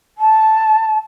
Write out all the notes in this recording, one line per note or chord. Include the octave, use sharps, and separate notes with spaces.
A5